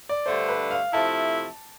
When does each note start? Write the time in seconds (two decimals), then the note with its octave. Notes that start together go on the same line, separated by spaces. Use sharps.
0.09 D5
0.26 G2 D3 A3 C5
0.49 B4
0.71 F5
0.92 C3 F3 A3 E4 A5